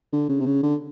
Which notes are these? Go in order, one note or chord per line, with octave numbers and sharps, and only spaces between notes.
D3
C#3
C3
C#3
D3